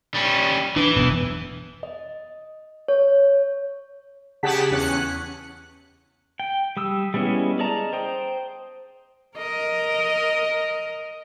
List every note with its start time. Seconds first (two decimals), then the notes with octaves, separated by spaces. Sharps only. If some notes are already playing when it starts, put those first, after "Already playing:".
0.14 G3 C#4
0.76 E3 D4
0.96 E1 F#2 B3
1.83 D#5
2.88 C#5
4.43 C#3 G4 G#4 F#5 A5 B6
4.71 E2 C#4 F#6 C#7
6.40 G5
6.77 G3 D#6 E6
7.14 G3 G#3 B3 C#4 E4
7.59 G#4 D5 D#5 A5 A#5
7.93 C5 G5 D#6
9.38 A#4 D#5